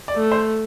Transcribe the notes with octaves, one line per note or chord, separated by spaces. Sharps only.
D5
A3
C5